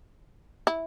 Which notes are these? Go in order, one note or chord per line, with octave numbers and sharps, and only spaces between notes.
E4